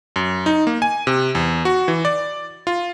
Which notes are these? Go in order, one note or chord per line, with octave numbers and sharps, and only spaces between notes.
F#2
D#4
A#3
G#5
C3
E2
F#4
E3
D5
F4